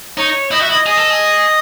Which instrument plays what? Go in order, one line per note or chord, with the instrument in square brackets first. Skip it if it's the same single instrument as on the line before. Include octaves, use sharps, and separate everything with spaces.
[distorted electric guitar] D#4 [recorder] C#5
[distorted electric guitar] E4 [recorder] D#5
[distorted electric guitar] F#4 [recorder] E5
[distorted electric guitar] E4 [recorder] D#5
[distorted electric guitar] G#4 [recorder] D#5
[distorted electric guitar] A4
G#4